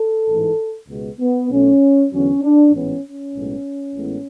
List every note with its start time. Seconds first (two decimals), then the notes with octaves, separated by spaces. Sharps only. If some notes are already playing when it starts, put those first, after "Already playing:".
Already playing: A4
0.28 A1 G#2 E3
0.88 C#2 B2 G#3 B3
1.19 B3
1.50 B1 B2 A3 C#4
2.11 E2 D3 F#3 B3 C#4
2.42 D4
2.72 A1 G#2 E3 G#3 B3 C#4
3.03 C#4
3.34 B1 A2 G#3 B3
3.94 A1 A2 G#3 B3